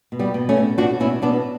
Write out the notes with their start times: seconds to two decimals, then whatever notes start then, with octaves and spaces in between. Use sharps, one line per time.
0.12 B2
0.19 G3 B3
0.34 B2
0.49 A3 C#4
0.57 B2
0.78 B2 D4 F#4
1.00 B2 C#4 E4
1.22 B2 B3 D4